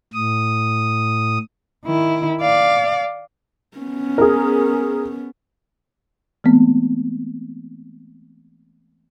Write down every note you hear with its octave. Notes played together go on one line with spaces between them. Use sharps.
A2 D#6
D#3 E4
D5 F5
B3 C#4
G#4 A#4
E3 G#3 A3 B3 C4